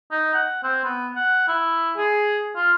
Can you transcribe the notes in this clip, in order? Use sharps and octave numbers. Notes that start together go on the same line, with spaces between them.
D#4
F#5
C4
B3
F#5
E4
G#4
F4